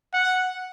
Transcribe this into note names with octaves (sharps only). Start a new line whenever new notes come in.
F#5